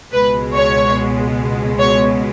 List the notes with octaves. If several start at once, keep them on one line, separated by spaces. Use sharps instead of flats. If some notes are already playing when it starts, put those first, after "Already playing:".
C#2 B2 G#3 B4
C#5
C#5